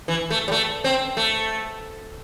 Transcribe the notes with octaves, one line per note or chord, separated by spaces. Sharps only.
E3
A3
G3
A3
C4
A3